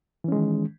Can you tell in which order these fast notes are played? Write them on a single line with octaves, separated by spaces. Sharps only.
E3 C#4 G#3 D#3